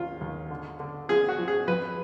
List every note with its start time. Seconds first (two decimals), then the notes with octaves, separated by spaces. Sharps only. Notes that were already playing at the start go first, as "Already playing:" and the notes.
Already playing: D#2 F#3 F4
0.21 D#2
0.50 D3
0.80 D3
1.09 F3 G#4
1.29 F#4
1.38 F3
1.48 G#4
1.67 F2 B4